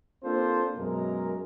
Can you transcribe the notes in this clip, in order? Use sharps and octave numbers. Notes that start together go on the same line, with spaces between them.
A#3 C4 D4 F4 A4 C5
F#2 B2 G#3 A#4